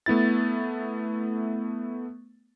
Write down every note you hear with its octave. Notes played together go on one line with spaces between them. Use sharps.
A3 B3 E4 A6